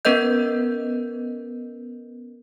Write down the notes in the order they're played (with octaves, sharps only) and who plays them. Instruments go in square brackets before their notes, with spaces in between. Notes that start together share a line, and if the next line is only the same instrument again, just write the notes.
[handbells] B3 C#4 A#4 B4 D#5 G6